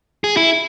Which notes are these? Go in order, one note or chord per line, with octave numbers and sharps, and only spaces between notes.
G#4
E4